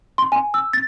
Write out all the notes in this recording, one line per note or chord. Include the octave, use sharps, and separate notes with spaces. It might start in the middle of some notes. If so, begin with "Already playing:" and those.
C6
G#5
E6
A6